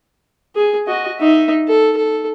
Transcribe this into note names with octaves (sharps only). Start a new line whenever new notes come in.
G#4
F#4 D#5
D#4 E5
A4
A4